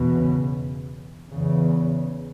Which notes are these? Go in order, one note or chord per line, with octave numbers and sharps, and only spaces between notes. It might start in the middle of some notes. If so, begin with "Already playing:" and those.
Already playing: E2 B2
C#3
E2 C#3